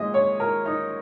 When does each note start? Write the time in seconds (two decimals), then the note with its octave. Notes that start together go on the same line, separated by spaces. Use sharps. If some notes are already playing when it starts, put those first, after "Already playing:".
Already playing: A#2 G#3 D#5
0.14 C#5
0.40 A#4
0.66 D#4